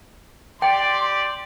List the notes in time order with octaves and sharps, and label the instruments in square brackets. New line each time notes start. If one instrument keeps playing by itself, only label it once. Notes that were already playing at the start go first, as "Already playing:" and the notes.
[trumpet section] G4 D5 [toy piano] G5 [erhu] C6